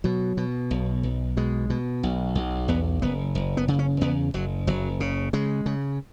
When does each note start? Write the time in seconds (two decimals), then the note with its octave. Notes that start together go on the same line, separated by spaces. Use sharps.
0.04 B2 F#3
0.37 B2
0.71 B1
1.03 B1
1.37 B2 G#3
1.70 B2
2.03 B1
2.35 B1
2.68 E2 B3
3.02 F#1 B3
3.35 F#1
3.57 B3
3.68 C#3
3.79 C#4
4.01 E2 B3
4.34 F#1 F#3
4.67 F#1 F#3
5.00 C#3
5.33 C#3 G#3
5.66 C#3